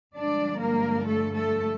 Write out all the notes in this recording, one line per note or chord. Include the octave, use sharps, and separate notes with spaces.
G2 D3 F3 G#3 D4 D5
A#3 A#4
A3 A4
A3 A4